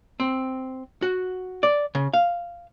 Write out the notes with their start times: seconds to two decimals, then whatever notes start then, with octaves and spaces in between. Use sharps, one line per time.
0.20 C4
1.02 F#4
1.63 D5
1.95 C#3
2.13 F5